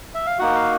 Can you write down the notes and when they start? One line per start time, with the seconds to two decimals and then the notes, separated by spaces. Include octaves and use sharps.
0.14 E5
0.26 F5
0.39 A#3 D#4 F#4 F#5
0.55 F5